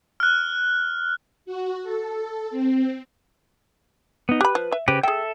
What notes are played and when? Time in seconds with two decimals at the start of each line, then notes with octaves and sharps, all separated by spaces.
0.20 F6 F#6
1.45 F#4
1.83 A4
2.50 C4
4.29 B3 D#4
4.41 G4 B4 B5 F#6
4.55 F3
4.72 E5
4.88 C#3 G4 B4 C5
5.03 G#4 A4 E5 G5